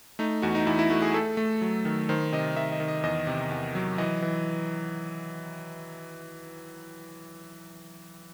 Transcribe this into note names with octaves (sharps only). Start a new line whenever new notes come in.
A3 D#4
E2 F#4
D#4
E2 E4
E4
A3 F#4
G#4
A3 A4
A3
F#3
D#3
D#3 C5
C3 D#5
D#3 E5
D#5
D#3
D#5
E2 D#5
C3
E2
F#3
E3 D#5
E3